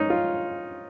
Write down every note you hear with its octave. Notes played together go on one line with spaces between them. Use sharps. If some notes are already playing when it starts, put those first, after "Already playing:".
Already playing: C#4 D#4
F4